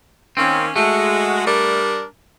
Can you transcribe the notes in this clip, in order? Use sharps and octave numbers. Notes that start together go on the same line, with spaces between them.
D#3 A#3 C4 C#4
G#3 A3 F#4
G3 D4 A#4